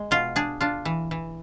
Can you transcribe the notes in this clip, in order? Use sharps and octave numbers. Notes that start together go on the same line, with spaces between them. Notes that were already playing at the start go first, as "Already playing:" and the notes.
Already playing: G#3
B2 F4
D4 G#4
D4 F4
E3
E3